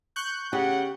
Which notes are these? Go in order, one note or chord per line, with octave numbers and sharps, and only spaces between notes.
C#6 F#6 G6
C#3 G4 F#5